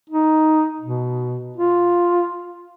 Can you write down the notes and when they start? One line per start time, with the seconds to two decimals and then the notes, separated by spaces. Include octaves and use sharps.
0.10 D#4
0.81 B2
1.57 F4